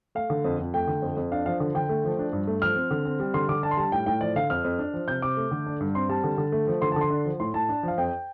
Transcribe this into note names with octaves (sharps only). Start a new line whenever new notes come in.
A3 F5
D3
F2
F2
A3 G5
D3
F2
F2
D4 F5
F3 F5
D3
D3 G5
A3
F3
D4
G2
A3
F3 F6
C4
D3
C4
G3
D3 C6
D3 D6
D4 A5
C6
G3 A5
A2 G5
A2 G5
F3 D5
D3 F5
F2 F6
F2
D4
F3
C3 G6
C3 D6
A3
D3
D4
G2
C4 C6
G3 A5
D3
D3
A3
F3
D3 C6
A5
D3 C6
D4
F3
A2 C6
A2 A5
D4
F3 F5
F2 G5